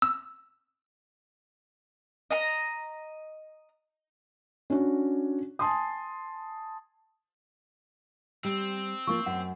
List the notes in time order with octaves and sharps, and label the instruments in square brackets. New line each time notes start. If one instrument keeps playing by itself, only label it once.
[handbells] E6
[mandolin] D#5 A#5
[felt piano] C#4 D4 F#4
G#5 A5 C6 D#6
[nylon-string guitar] G3 [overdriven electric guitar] C4
[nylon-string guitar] F3 A#3 F4 [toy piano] C#6
[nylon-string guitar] F#2 [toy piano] F#5